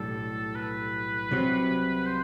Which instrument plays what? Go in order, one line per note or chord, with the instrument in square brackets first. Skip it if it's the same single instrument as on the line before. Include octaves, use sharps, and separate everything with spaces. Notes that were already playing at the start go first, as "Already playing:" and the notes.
Already playing: [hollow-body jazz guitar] B1 A2 G3 D4 [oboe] A4
[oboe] B4
[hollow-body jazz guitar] C2 C3 F#3 C4
[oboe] C5